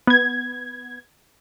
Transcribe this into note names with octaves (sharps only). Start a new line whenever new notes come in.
B3 G#6